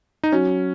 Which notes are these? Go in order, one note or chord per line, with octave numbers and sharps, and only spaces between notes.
D#4
F#3 C#4